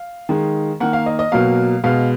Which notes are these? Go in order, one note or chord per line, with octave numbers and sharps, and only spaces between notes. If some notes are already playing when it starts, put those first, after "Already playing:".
Already playing: F5
D#3 G#3
D#3 A#3 F#5
F5
D#5
D#5
B2 F#3 A#3 F5
B2 G#3 F5